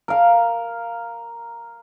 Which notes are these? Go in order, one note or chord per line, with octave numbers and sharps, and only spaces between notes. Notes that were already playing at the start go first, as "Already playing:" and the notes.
A#4 F5